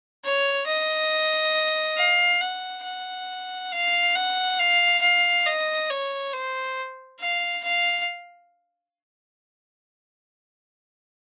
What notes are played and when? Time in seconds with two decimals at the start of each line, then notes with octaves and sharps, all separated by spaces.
0.24 C#5
0.67 D#5
1.97 F5
2.41 F#5
2.84 F#5
3.72 F5
4.16 F#5
4.59 F5
5.02 F5
5.46 D#5
5.90 C#5
6.33 C5
7.20 F5
7.63 F5